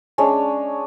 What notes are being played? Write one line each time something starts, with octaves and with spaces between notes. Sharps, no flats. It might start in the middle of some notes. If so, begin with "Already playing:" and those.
G#3 C#4 D4 C#5